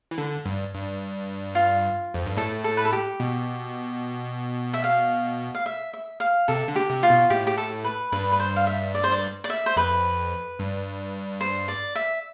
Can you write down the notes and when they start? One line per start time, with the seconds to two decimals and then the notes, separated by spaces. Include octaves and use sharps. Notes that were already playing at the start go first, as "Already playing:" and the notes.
0.11 E3
0.18 D3
0.45 G2
0.74 G2
1.55 F4
2.14 F2
2.26 G2
2.37 A2 A4
2.64 A4
2.77 B4
2.85 A4
2.93 G4
3.20 B2
4.74 E5
4.84 F5
5.55 F5
5.66 E5
5.93 E5
6.20 F5
6.48 C3 A4
6.68 D3
6.76 G4
6.90 C3
7.03 F4
7.10 B2
7.30 A2 G4
7.47 G4
7.58 A4
7.84 B4
8.12 G2 B4
8.32 B4
8.40 C5
8.56 F5
8.67 E5
8.94 D5
9.04 C5
9.12 D5
9.44 D5
9.50 E5
9.66 C5
9.76 F2 B4
10.59 G2
11.41 C5
11.68 D5
11.95 E5